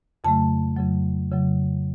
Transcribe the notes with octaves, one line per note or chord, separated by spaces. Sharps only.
F2 C#3 F#3 A3 A5
F2 C#3 F#3
F2 C#3 F#3